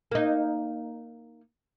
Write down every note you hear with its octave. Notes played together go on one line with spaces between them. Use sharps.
A#3 D#4